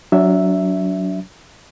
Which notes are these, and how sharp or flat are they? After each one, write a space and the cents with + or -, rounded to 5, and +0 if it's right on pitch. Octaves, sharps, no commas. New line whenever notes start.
F#3 +0 D4 -35 E5 +0